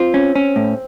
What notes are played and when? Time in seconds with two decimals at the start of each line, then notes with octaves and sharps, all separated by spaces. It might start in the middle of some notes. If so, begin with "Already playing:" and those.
Already playing: C4 F4
0.14 C#4
0.36 C#4
0.56 A2